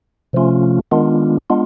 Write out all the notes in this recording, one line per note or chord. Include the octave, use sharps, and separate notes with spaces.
C3 F3 A3 C#4 F4
D#3 G#3 B3 D4 F4
G#3 B3 D4 F4